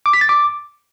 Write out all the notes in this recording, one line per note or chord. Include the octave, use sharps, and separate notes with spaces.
D6
B6
A6
D6